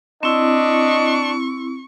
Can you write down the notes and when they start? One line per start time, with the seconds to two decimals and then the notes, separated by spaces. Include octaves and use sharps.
0.23 C4 D4 E4 D#5 C#6